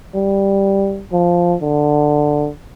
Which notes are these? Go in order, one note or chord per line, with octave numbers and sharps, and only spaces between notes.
G3
F3
D3